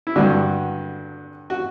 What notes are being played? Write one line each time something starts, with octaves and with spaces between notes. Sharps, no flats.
E4
G2 D3 F#4
F#4